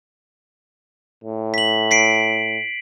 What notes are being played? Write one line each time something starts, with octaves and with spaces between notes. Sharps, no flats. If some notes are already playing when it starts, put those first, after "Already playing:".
A2
B6 F#7
B6 C7 D7